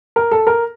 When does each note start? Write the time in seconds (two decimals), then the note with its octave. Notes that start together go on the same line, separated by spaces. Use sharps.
0.16 A#4
0.31 A4
0.47 A#4